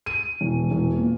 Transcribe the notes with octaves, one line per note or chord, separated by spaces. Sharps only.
D#7
E1
E1
A#2